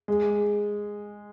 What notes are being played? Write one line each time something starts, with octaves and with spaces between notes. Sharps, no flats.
G#3